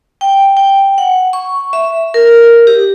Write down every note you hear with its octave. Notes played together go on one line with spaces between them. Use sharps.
G5
G5
F#5
C#6
E5
A#4
G4